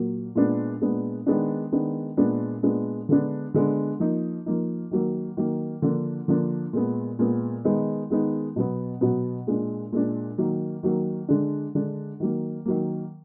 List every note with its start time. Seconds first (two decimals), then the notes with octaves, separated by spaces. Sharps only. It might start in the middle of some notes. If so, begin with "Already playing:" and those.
Already playing: A#2 F#3 A#3
0.35 A#2 G#3 B3 D4
0.81 A#2 G#3 B3 D4
1.26 D#3 G#3 B3 D4
1.72 D#3 G#3 B3 D4
2.17 A#2 G#3 B3 D4
2.63 A#2 G#3 B3 D4
3.09 D3 G#3 B3 D4
3.54 D3 G#3 B3 D4
4.00 F3 A#3 D#4
4.46 F3 A#3 D#4
4.91 D#3 F#3 A#3
5.37 D#3 F#3 A#3
5.82 D3 F3 A#3 D4
6.28 D3 F3 A#3 D4
6.73 A#2 G#3 B3
7.19 A#2 G#3 B3
7.65 D#3 G#3 B3 D#4
8.10 D#3 G#3 B3 D#4
8.56 B2 F#3 B3
9.01 B2 F#3 B3
9.47 A#2 G#3 D4
9.92 A#2 G#3 D4
10.38 D#3 F#3 A#3
10.83 D#3 F#3 A#3
11.28 D3 G#3 D4
11.75 D3 G#3 D4
12.20 D#3 F#3 A#3
12.65 D#3 F#3 A#3